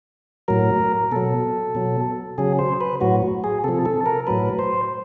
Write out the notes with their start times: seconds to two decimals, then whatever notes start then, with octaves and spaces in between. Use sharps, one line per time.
0.48 A2 F#3 A#4
1.12 B2 F#3 A4
1.75 B2 F#3
2.38 C#3 F#3 G#4
2.59 C5
2.81 B4
3.01 A2 F#3 F#4
3.44 G#4
3.64 C3 F3 A4
3.86 A4
4.06 A#4
4.27 A2 F#3 B4
4.59 C5